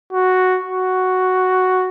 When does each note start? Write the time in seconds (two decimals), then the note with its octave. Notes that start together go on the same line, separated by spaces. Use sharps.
0.13 F#4
0.64 F#4